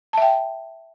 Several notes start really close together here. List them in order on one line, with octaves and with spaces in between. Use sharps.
A5 E5 G5